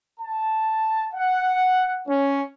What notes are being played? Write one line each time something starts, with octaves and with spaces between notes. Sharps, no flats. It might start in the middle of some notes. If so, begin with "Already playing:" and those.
A5
F#5
C#4